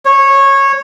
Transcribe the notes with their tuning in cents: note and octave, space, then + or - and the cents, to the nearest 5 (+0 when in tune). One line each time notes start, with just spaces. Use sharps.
C#5 -15